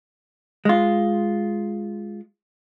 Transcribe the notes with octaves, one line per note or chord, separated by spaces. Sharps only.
G#3 F4